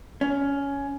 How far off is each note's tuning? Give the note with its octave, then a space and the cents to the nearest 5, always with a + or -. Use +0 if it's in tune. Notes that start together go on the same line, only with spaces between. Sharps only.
C#4 +15